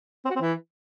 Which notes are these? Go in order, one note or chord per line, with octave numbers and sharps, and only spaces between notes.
C4
F#4
C4
E3